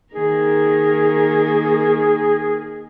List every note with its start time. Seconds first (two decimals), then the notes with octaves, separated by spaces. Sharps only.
0.14 D#3 A#3 G#4 A#4